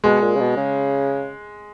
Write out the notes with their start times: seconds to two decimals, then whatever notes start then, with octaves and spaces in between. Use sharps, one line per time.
0.04 B2 G#3
0.22 A#2
0.35 C#3
0.40 B2
0.57 C#3